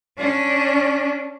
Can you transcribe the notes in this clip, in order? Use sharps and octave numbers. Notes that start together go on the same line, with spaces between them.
C#4 D4